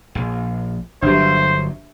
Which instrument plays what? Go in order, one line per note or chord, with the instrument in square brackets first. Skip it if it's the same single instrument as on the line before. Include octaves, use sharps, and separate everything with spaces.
[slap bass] A#1
[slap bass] G1 F#3 [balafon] D4 G4 [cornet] C5 [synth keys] E5